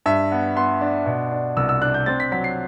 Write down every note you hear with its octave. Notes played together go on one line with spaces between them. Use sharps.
G2 E5
B3
B3 C6
D4
B2
D4
C2 E6
E6
D4 F#6
G6
C4 A6
B6
F#3 B6
C7